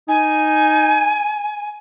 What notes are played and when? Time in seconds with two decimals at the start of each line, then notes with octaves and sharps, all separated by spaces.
0.08 D#4 G#5